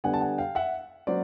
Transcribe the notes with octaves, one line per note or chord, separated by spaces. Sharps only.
D3 G3 B3 F#5 G#5
A5
F#5 G#5
F5 G5
E5 F#5
F#3 A#3 C#4 C5 D5